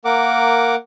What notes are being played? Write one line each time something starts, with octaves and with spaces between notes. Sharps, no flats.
A#3 A#4 F#5 D6